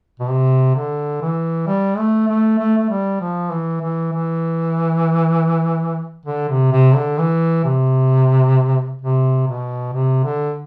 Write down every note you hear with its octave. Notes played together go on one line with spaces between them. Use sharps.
B2
C3
D3
E3
G3
A3
A3
A3
A3
G3
F3
E3
E3
E3
D3
C3
C3
D3
E3
C3
C3
B2
C3
D3